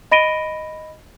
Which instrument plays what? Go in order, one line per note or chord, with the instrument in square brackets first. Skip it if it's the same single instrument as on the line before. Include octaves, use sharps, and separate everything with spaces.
[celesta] D#5 B5 A#6 D7 D#7 G7